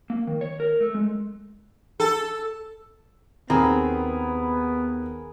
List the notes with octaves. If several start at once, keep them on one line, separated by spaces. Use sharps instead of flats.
A#3
D#3
C#5
A#4
A3
G#3
A4
D#2 B3 C4 G#4 A#4 B5